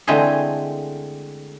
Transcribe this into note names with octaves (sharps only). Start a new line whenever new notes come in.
D3 E3 G#3 A3 C4 G#4